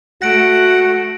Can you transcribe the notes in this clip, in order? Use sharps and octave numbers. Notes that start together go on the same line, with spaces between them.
A3 F#4 F#5 A#6 D7